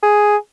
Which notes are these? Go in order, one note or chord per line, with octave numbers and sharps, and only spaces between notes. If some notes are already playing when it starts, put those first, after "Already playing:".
G#4